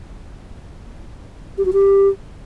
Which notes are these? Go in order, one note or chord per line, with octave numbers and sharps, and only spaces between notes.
G4
F#4
G4